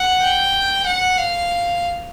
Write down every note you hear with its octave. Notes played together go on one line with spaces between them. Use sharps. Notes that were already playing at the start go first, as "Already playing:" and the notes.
Already playing: F#5
G5
F#5
F5